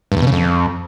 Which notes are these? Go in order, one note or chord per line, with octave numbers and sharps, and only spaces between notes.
G2
E2
B2
C#3
F2